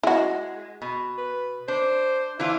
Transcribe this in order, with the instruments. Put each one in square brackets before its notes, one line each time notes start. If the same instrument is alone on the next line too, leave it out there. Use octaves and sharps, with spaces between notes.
[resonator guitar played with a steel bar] G#3 [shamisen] E4 F#4
[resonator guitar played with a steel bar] B2
[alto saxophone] B4
[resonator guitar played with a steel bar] D4 [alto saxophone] C5
[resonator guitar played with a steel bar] E3 D4 F4 [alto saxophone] E4